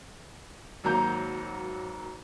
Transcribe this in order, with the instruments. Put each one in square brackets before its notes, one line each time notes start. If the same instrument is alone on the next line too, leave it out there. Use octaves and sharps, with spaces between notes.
[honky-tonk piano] G#1 F#3 A#3 A#5 G6